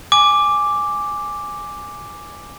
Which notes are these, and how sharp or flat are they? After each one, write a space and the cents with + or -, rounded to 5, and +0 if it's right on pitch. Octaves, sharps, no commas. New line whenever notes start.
G#5 +0 D6 +0